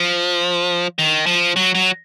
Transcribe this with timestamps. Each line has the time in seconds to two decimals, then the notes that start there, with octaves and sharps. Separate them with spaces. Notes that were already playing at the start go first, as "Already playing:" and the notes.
Already playing: F3
0.99 D#3
1.27 F3
1.56 F#3
1.75 F#3